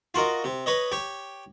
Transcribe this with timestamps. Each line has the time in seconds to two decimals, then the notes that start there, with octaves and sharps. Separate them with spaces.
0.14 F4 F#4 A#4 D#5
0.44 C3
0.66 B4 C#5 D#5
0.92 G4 C#5